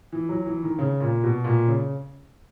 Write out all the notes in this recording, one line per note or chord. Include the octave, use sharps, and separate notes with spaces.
E3
F#3
E3
D#3
C#3
A#2
B2
A#2
C#3